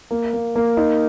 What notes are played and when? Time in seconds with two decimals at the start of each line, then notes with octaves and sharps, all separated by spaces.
0.11 A#3
0.33 A#3
0.55 A#3
0.77 D#4